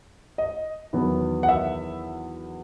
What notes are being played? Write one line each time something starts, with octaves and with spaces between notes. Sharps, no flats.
D#5
E2 D#3 F#3 B3 E4
F#5
E5